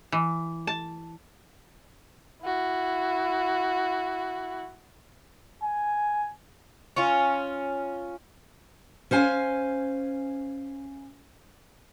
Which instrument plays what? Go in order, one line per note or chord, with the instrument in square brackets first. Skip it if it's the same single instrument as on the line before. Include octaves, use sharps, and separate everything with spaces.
[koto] E3
A5
[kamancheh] E4 F#4
[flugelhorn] G#5
[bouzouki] C#4 F4
[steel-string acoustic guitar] C#4 C5 F5 G#5